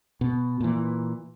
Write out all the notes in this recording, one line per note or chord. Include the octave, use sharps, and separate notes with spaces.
B2
A#2 E3